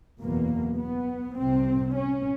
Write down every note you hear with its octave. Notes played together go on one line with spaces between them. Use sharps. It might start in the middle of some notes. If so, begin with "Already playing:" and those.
F#1 E2 B2 A#3
B3
C2 C3 C4
C#4